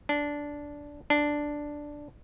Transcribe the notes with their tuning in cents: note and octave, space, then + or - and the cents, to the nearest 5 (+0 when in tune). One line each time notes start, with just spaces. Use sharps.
D4 -10
D4 +0